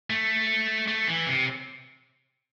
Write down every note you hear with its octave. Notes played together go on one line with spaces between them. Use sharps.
A3
A3
E3
C3